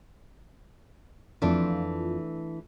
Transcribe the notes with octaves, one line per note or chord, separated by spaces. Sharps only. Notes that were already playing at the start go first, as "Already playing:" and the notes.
F2 E3 A3 D4 F4